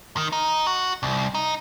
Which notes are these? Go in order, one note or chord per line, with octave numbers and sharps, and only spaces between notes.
D#3
D#4
F#4
C2
D#4